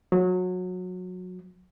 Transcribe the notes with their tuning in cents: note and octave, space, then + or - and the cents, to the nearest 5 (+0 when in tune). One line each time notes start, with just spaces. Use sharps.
F#3 -25